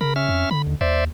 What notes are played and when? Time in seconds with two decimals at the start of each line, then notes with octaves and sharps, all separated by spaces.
0.01 C#3 A#4 B5
0.16 C#4 E5 F6
0.29 F2
0.51 D3 B5
0.67 D#2
0.81 D#2 C5 D5 E5